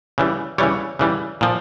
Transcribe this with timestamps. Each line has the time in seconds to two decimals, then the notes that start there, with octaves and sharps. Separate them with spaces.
0.18 C#3 E3 G3
0.58 C#3 E3 G3 C#5
0.99 C#3 E3 G3
1.41 A#2 F3